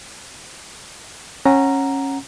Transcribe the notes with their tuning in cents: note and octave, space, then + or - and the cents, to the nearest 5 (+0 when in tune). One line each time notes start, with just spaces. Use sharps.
C#4 -20 F#5 +0 A#5 +0